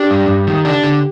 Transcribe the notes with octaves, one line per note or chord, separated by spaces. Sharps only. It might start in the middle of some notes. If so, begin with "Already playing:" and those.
Already playing: D4 G4
G2
G2
D#3
D4
D3